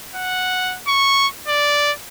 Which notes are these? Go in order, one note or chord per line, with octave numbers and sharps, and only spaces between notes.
F#5
C#6
D5